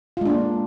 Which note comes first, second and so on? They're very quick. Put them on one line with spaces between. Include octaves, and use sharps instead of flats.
F4 G#3 D4 A#3